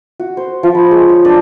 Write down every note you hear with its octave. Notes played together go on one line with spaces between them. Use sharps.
F#4
C5
F3
B5
G#3
C#5
D4